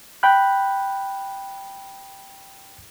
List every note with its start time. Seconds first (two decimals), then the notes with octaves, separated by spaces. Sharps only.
0.23 G5 B5 F#6